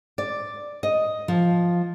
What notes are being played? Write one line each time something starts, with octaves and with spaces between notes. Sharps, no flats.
D5
D#5
F3